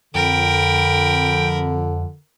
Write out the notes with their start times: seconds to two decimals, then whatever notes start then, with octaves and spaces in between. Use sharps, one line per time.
0.15 F2 D3 A#4 G5 B5